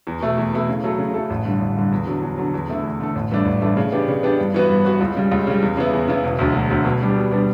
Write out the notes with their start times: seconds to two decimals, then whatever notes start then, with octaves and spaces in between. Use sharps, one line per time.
0.07 E2
0.21 B2 A3 E4
0.38 E2
0.53 B2 A3 E4
0.69 C#3
0.84 F#3 A3 E4 A4
0.99 C#3
1.14 F#3 A3 E4 A4
1.30 A1
1.45 G2 D3
1.61 A1
1.76 G2 D3
1.92 E2
2.07 D3 F#3
2.22 E2
2.37 D3 F#3
2.54 E2
2.69 D3 A3 E4 A4
2.84 E2
3.00 D3 A3 E4 A4
3.15 A1
3.31 G2 E3 A3 D4
3.45 A1
3.61 G2 E3 A3 D4
3.77 C#3
3.92 E3 B3 D4 G4
4.08 C#3
4.23 E3 B3 D4 G4
4.39 G2
4.54 E3 B3 F#4 B4
4.69 G2
4.85 E3 B3 F#4 B4
5.01 C#2
5.16 C#3 G3
5.32 C#2
5.47 C#3 G3
5.62 E2
5.77 C#3 E3 B3 E4
5.93 E2
6.08 C#3 E3 B3 E4
6.24 E1
6.39 D2 D3 F#3
6.54 E1
6.70 D2 D3 F#3
6.85 B2
7.01 G3 B3 D4 G4
7.16 B2
7.31 G3 B3 D4 G4